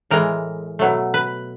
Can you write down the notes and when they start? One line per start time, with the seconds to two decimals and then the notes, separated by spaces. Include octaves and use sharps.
0.10 A2 E3 G#3 A#4
0.79 B2 F#3 A3
1.14 B4